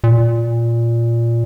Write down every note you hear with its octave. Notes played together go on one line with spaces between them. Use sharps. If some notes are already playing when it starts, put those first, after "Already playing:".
A#2